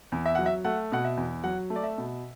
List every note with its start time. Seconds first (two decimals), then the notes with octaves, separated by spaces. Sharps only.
0.12 E2
0.26 E5
0.35 F#3 F#5
0.46 E5
0.64 A3 F#5
0.92 B2 F#5
1.04 E5
1.17 E2
1.44 F#3 F#5
1.70 A3
1.76 D5
1.83 E5
1.98 B2